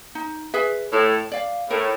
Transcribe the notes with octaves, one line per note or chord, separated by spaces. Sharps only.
D#4
G#4 B4 E5
A2 A4
D5 F5
A2 A#4